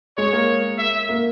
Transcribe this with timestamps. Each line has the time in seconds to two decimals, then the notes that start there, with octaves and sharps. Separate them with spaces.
0.18 G#3 C#5
0.32 A#3
0.78 E5
1.09 A#3